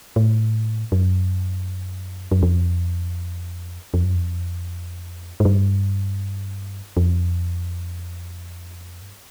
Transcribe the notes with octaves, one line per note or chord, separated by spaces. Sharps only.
A2
F#2
F#2
F2
F2
F#2
F2
G#2
G2
F2
G2